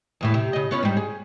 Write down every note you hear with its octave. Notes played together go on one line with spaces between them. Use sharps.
E2 A2 E3
C3
C#3 D#5
B3 C#4 F4
G#2 G3
G#4